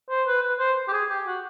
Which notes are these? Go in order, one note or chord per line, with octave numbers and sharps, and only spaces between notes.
C5
B4
B4
C5
G4
G#4
G4
F#4